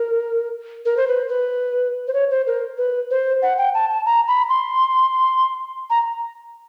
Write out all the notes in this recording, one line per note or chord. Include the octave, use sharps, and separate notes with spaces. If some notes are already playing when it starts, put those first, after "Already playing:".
Already playing: A#4
A#4
C5
B4
B4
C5
C#5
C5
A#4
B4
C5
F#5
G5
A5
A5
A#5
B5
C6
A#5